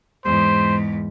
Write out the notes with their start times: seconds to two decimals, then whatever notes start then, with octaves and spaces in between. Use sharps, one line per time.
0.25 E2 G#2 C5